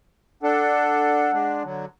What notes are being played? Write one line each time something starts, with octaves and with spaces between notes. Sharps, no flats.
D4 A4 F#5
G#3 D4
D3 F#3